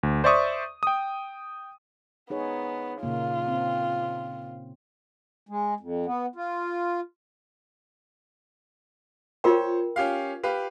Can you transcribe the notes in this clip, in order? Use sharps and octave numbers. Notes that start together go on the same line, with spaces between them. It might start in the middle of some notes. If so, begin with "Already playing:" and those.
D2
C5 D5 E5 C#6 D#6
G5 D#6
B3 D#4 G#4 C#5
A#2 C#3 A#3 F4
C4
G#3
F2
B3
F4
F4 A#4 C5 C#5 G5
C#4 G4 F5
G4 B4 F5